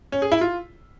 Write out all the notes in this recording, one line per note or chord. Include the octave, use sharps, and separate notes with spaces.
C#4
G#4
E4
F4